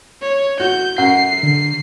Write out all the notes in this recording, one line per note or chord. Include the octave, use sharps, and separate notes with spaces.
C#5
F#4 G6
F#2 F#5 C7
D3